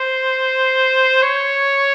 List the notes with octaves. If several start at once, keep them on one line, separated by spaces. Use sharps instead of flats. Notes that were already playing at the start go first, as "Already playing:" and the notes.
Already playing: C5
C#5